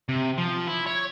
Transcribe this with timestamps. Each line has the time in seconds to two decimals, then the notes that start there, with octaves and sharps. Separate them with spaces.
0.09 C3
0.38 F3
0.67 E4
0.87 C#5